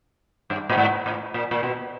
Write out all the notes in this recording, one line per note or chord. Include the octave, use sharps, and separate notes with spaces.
G2
A2
G#2
A2
A#2
A#2
B2